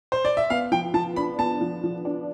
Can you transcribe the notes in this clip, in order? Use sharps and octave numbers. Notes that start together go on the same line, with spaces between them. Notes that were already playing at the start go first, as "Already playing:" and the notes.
C5
D5
E5
B3 F5
F3 G5
F3 A5
D4 B5
B3 A5
F3
F3
D4